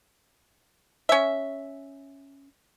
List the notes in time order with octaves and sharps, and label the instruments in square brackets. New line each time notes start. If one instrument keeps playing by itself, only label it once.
[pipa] C#4 E5